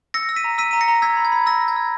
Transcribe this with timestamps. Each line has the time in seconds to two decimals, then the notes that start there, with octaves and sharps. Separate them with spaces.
0.14 E6 A#6 C#7
0.29 E6
0.36 B6 D#7
0.44 A#5
0.58 E6 B6 D#7
0.71 A#5 D#7
0.81 A#6 C#7
0.88 A#5
1.02 E6 G#6 B6
1.17 B5
1.25 G#6
1.32 B5
1.46 E6 A#6
1.61 E6
1.68 G#6
1.76 E6